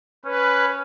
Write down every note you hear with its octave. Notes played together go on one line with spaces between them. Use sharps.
C#4 B4